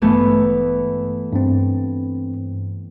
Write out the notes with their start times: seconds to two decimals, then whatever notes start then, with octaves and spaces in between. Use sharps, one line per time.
0.02 A1 G2 E3 A3 B3
1.32 G2 C4